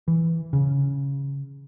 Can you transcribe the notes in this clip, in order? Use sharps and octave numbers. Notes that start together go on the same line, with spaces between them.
E3
C#3